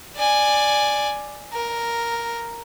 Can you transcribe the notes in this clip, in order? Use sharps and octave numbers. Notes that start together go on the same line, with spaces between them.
D5 G#5
A#4